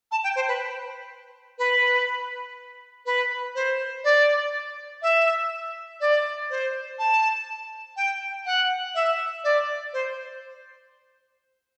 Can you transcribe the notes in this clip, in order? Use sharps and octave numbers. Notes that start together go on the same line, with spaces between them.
A5
G5
C5
B4
B4
B4
C5
D5
E5
D5
C5
A5
G5
F#5
E5
D5
C5